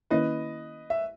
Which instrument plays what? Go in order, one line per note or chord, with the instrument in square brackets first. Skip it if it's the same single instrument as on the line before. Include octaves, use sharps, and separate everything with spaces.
[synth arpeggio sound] D#3 A#3 C#4 E4 [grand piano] B4 D#5
[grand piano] E5